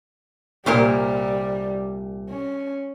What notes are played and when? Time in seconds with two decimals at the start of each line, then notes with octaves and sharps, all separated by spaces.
0.66 C2 A#2 G3 A#4
2.30 C#4